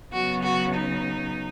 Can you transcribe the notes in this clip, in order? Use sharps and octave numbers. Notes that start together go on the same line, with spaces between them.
C#3 F#3 B3 F#4
F#4
D#4